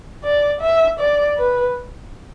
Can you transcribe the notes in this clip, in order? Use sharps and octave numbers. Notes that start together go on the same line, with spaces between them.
D5
E5
D5
B4